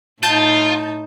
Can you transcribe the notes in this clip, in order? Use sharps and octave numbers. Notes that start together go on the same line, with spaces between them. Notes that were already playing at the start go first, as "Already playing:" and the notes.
A2 D#4 F4 A5 G6